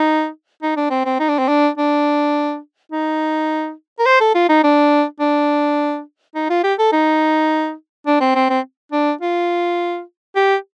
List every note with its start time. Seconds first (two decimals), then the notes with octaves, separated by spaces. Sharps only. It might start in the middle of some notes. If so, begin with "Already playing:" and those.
Already playing: D#4
0.63 D#4
0.77 D4
0.91 C4
1.05 C4
1.20 D#4
1.29 D4
1.39 C4
1.48 D4
1.78 D4
2.92 D#4
3.99 A#4
4.06 C5
4.21 A4
4.35 F4
4.49 D#4
4.64 D4
5.20 D4
6.35 D#4
6.50 F4
6.64 G4
6.79 A4
6.92 D#4
8.07 D4
8.21 C4
8.35 C4
8.50 C4
8.92 D4
9.21 F4
10.36 G4